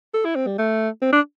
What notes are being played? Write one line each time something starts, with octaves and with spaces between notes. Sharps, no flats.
A4
E4
C4
G3
A3
C4
D4